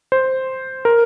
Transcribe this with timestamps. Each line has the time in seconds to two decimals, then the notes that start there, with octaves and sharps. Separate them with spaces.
0.12 C5
0.85 A#4